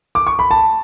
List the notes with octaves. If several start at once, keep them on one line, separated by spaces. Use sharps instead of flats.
D6
C#6
B5
A5